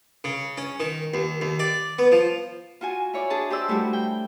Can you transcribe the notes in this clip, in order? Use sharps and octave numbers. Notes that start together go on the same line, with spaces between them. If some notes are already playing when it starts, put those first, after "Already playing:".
C#3
C#4
D#3
D#2
D#2
D5
B3
F3
F4 F#4 G#5
E4 C#5 D5
D4 G#4 A5
G4 C5 D5 E6
G3 A3 E4 F#4 G4
G5